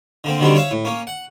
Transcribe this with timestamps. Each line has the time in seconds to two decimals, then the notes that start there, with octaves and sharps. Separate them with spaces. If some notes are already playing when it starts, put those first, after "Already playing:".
0.24 D3 A#3 C4
0.40 D3 D#3 F#3 G3 C4 D4
0.55 C#5 E5 F5
0.71 A2
0.85 A#3 C#4
1.07 F#5